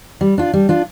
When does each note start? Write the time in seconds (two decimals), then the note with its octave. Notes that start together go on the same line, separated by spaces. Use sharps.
0.21 G3
0.38 D4 F4
0.53 G3
0.69 D4 F4